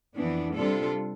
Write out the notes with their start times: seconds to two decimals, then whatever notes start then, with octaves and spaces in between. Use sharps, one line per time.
0.16 F2 E3 B3 D4
0.55 C3 G3 D4 F4 A4